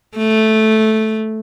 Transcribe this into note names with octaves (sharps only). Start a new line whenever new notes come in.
A3